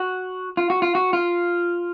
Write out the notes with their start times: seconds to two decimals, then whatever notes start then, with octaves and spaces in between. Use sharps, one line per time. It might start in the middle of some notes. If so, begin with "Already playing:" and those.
Already playing: F#4
0.57 F4
0.70 F#4
0.82 F4
0.95 F#4
1.13 F4